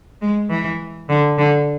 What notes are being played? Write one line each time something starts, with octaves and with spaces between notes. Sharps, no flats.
G#3
E3
D3
D3